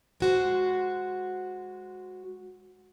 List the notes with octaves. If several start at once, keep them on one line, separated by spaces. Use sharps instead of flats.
G#3 F#4 C5